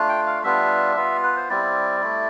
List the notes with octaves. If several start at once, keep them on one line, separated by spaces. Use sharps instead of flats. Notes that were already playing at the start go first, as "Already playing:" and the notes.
Already playing: A3 D4 F4
G5
F5
G3 B3 D4 F4 E5
B3 F4
B4
C5
G3 C4 E4 D5
A3 E4